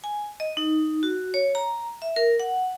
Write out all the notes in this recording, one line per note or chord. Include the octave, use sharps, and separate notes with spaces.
G#5
D#5
D#4
F#4
C#5
A#5
E5
A#4
F#5